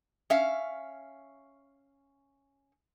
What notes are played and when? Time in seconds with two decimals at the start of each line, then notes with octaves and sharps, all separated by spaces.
0.30 C#4 E5 F5